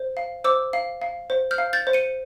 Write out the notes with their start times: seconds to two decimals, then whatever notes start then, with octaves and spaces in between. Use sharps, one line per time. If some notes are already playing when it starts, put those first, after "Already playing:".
Already playing: C5
0.17 F5
0.44 C5 D6 E6
0.73 F5
1.02 F5
1.30 C5
1.51 F6 G6
1.58 F5
1.73 G6 A6
1.87 C5
1.93 C#7 D#7